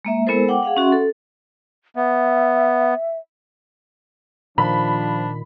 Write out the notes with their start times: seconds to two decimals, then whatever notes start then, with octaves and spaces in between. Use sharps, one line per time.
0.05 G#3 A#3 E5
0.27 G#3 B3 E4 A4 A#4 C5
0.48 F#5 G5 D6
0.63 G#4 F5 F#5
0.77 C#4 F#4 E5 F#5 C6
0.92 A4
1.96 B3 E5
4.58 A#2 D#3 F3 D4 B5